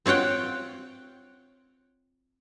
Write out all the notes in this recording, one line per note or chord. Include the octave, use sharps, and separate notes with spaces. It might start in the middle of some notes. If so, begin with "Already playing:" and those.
C4 F4 C#5 F#5 G5